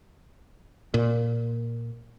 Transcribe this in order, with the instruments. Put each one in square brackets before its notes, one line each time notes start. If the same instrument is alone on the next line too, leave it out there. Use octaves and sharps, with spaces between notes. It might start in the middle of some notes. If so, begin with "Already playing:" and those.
[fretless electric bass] A#2